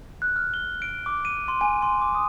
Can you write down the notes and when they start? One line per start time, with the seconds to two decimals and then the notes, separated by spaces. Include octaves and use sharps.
0.22 F#6
0.36 F6
0.54 G7
0.82 D7
1.06 D6
1.25 D#7
1.48 C6
1.61 G#5
1.82 C6
2.01 D6
2.15 D#6